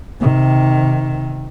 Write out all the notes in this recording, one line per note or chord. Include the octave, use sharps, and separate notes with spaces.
C3 D#3